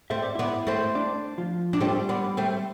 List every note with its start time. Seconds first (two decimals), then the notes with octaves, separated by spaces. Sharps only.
0.10 A3 C4 E5
0.22 D5
0.35 B3 D4 E4 E5
0.67 A3 C4
0.95 D4 D5
1.38 F3 F4
1.73 D4
1.81 G3 A3 C4 G4
2.09 B3 D4
2.37 A3 C4